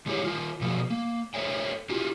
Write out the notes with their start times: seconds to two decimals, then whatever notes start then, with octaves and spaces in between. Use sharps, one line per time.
0.06 D#3 G#3 E4 G4 C#5
0.24 D#3 F4
0.61 B2 F3 F#3
0.90 A#3
1.34 A4 C5 C#5 E5 G5
1.90 E4 F4 G4